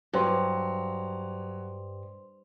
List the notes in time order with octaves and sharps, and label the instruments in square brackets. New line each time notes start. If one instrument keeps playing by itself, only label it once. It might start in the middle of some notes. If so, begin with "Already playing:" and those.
[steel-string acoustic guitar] G2 [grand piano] F#3 [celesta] C5 C6